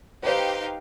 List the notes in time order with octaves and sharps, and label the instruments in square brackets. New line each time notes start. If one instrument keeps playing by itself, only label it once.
[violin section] D#4 G4 F5 [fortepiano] B4 C5